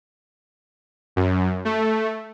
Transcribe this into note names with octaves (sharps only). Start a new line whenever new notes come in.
F#2
A3